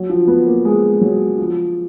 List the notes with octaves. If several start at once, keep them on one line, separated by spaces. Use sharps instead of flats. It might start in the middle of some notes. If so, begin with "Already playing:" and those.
Already playing: F#3
F3
B3
A#3
G#3
F#3
F3